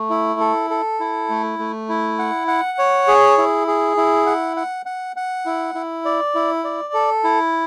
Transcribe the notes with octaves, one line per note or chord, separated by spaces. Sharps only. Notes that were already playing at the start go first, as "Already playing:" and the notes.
Already playing: A3
E4
A4
A4
E4
A3
A3
E4
F#5
F#5
C#5
G#4
E4
G#4
E4
F#5
F#5
F#5
F#5
E4
E4
D5
E4
D5
A4
E4